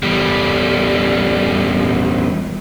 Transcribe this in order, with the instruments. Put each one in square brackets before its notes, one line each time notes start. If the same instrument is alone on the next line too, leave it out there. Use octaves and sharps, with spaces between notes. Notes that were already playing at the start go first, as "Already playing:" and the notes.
[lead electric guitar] E2 G3